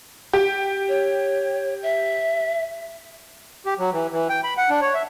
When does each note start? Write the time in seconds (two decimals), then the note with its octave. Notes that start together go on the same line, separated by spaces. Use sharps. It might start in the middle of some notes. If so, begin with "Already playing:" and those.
0.33 G4
0.88 C#5
1.82 E5
3.66 G4
3.79 F#3
3.93 E3
4.12 E3
4.29 G5
4.44 B5
4.58 F#5
4.70 D4
4.81 C#5
4.94 E5